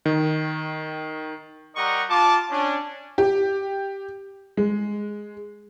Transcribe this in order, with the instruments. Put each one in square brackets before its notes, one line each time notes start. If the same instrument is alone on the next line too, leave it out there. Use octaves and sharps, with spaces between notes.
[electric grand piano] D#3
[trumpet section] G3 A#4 D#5 F#5 A#5 C#6
F4 A5 D6
C#4 D4
[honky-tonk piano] G4
G#3